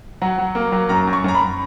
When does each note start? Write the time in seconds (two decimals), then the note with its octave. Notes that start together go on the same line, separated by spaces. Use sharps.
0.22 F#3 F#5
0.38 F#3
0.55 A#3
0.72 F#3
0.89 F#2 A#5
1.07 F#2
1.13 C#6
1.24 F#2 A#5
1.35 B5